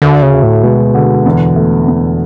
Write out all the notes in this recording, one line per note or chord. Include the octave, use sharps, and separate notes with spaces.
D2 D3
C#3
D2
A2
B2 G#3
D3
E2
A3
E2